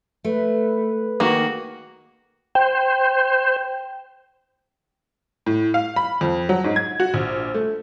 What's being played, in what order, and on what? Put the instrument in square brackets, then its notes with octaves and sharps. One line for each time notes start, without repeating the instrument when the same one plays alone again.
[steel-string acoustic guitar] A3 [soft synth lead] B4
[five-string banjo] D#3 A#3 [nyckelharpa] F#4 [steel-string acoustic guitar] G#4
[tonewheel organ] C5 [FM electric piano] G5
[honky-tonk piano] A2
F5
B5
F2
F#3
G#2
G#6
F#4
A#1
A3